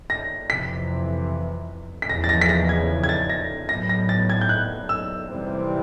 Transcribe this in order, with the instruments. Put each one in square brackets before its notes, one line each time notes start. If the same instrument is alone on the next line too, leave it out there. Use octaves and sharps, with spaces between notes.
[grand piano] A#6
[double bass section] F2 C3 E3 [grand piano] B6
[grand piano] B6
[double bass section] E2 C#3 F3 [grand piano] A#6
[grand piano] A6
A#6
B6
A#6
G#6
G#6
A6
A#6
[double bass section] A2 F#3 B3 [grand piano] A#6
[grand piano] A#6
A6
G#6
G6
F#6
E6
[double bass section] C3 E3 G3 C4